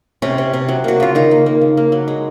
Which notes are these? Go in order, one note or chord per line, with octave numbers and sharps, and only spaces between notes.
C3 C#4
C3
C3
F#3
A#3 F#4
C#3 F4
D#3 D#4
A#3
A#3
C#3
A#3
F#3
G#3